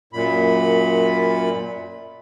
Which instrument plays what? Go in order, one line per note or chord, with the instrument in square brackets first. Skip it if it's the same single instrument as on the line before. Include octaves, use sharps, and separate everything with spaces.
[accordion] F#2 A#2 B5